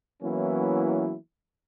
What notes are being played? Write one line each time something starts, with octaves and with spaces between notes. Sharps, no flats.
E3 F#3 A#3 B3 C#4 E4